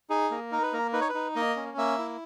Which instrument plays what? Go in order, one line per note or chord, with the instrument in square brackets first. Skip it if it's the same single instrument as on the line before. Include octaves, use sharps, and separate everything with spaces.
[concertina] D#4 G#4
A#3
D#4 A#4
B4
A#3 A#4
D#4 B4
C#5
B4
D#4
A#3 D#5
C#4
A#3 E5
E4